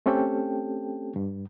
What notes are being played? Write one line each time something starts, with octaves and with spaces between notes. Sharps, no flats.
A3 C4 C#4 G4 A4 G5
G2